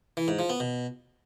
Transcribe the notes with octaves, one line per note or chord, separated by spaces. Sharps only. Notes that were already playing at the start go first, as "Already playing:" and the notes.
E3
G#2
F3
B3
B2